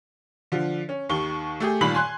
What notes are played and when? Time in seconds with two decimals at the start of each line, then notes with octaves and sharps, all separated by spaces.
0.52 D3 F3
0.89 C#4
1.09 D#2 D#3 C#6 G7
1.60 A3 G4 G#4
1.81 G1 A#2 D#3 B5 F#7
1.94 G#5 C6 F#6